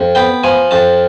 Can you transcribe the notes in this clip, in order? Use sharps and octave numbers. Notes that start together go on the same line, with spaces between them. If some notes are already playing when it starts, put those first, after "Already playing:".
Already playing: F2
B3 G5
F3 G#5
F2 A5